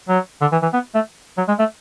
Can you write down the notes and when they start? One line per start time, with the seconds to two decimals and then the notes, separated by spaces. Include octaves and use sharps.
0.08 F#3
0.41 D3
0.52 E3
0.62 E3
0.73 B3
0.95 A3
1.37 F#3
1.48 G#3
1.59 A3